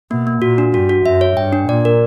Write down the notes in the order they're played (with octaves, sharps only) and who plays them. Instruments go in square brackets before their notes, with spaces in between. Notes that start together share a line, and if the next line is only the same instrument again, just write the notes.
[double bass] B2 [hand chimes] A#3
[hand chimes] A#3
[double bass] A#2 [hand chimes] F#4
[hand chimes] D4
[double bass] G2 [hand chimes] F#4
[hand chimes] F#4
[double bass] F#2 [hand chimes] E5
[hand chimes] C#5
[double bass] G2 [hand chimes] G5
[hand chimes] D4
[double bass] A#2 [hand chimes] D5
[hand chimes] A#4